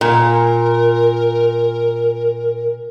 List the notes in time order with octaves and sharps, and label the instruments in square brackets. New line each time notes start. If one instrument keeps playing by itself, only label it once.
[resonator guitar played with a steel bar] A#2 [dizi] A#4